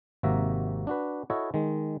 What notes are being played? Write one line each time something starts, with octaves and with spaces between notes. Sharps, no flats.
G#1 C3 A#3 F#4 E5 A#5
D4 F#4 B4
E4 F#4 A4 C#5 D#5
D#3 G#3